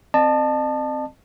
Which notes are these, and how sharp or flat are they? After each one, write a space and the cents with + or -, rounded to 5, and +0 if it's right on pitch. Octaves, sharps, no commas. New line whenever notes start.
C4 +0 D#5 -45 A5 +0